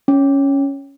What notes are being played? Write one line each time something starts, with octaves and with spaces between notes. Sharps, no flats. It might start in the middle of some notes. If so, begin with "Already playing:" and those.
C#4